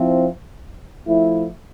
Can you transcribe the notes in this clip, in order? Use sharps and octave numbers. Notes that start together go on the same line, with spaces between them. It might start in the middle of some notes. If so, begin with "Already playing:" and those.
Already playing: F3 C4 E4
F3 A3 E4